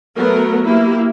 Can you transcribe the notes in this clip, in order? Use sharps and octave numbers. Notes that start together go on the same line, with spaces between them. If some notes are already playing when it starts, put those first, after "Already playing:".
F#3 A3 B3 A#4
A#3 E4 G4